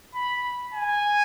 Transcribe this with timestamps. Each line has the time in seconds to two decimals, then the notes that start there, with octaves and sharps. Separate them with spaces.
0.15 B5
0.74 G#5